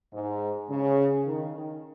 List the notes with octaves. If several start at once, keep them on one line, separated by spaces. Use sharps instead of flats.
G#2
C#3
D#3
D#3